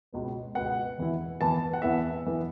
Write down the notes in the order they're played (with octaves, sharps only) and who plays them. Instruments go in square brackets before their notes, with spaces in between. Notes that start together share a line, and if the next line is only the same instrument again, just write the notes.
[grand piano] C#2 B2 B3
C#2 B2 B3 F#5
E2 E3 B3 E4
E2 E3 B3 E4 A5
F#5
E2 E3 B3 E4 E5
E2 E3 B3 E4